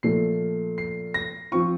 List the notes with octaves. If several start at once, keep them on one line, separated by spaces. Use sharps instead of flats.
A#2 F3 A3 C7
C7
A#6
F3 C4 F4 C#6